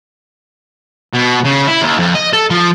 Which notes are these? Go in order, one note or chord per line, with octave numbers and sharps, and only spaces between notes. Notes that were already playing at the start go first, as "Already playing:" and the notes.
B2
C#3
E4
D#2
F2
D#5
A4
F3